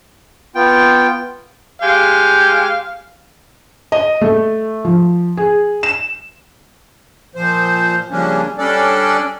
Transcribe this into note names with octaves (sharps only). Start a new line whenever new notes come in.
B3 F4 G5
G#3 G4 F5
D#5
A3
F3
G#4
E7
A#2 F3 C5
C#3 F3 G3 A#3 C#4 D4
G3 C#4 D4 A4 D5